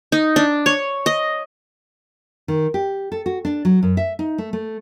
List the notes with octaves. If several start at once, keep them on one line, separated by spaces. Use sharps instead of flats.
D#4
D4
C#5
D#5
D#3
G4
A4
F#4
D4
F#3
F#2
E5
D#4
A3
A3